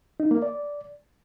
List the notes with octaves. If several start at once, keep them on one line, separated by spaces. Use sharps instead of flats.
D#4
A#3
D5